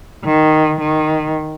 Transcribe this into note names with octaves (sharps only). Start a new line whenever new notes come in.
D#3
D#3